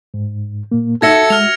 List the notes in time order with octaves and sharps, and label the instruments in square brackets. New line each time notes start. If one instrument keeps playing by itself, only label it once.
[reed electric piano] G#2
A#2 A#3
[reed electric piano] D#4 [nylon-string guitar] F#4 E5 [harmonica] A4 [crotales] G#6 A#6 C#7
[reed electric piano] G#3 [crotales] F6 F7